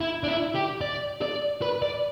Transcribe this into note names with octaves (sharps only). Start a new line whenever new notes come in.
E4
D4
E4
G4
D5
D5
B4
D5